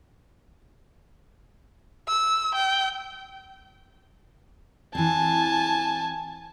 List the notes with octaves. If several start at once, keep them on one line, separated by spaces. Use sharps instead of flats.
E6
G5
E3 C4 G#5 A5